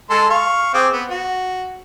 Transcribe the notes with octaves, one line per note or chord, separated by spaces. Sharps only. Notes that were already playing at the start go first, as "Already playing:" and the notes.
G#3 A4 C6
F5 C#6
C4 G#4 D6
B3
F#4